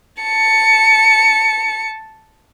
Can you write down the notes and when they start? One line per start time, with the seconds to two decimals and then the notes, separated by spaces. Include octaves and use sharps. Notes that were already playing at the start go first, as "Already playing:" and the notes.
0.23 A5 C#7